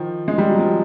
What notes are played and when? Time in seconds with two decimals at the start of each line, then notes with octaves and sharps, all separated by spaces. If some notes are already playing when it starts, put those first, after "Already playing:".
Already playing: D#3 F3
0.28 G#3
0.38 G3
0.49 F#3
0.59 F3 G3